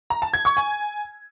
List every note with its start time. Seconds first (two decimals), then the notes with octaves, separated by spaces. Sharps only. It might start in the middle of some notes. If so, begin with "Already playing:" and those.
0.10 A#5
0.22 A5
0.34 G#6
0.45 C#6
0.57 G#5